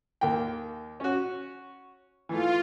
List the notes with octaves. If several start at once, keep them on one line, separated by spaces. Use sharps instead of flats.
D#2 A#3 G5
C#4 F#4
E3 A3 F4